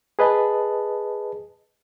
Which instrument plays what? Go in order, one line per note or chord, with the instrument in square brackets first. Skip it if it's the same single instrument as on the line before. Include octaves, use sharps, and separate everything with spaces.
[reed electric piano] G#4 B4 D#5 A5